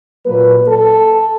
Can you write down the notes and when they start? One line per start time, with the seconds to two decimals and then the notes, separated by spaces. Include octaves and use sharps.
0.26 A#2 F#3 A#3 B4
0.68 A4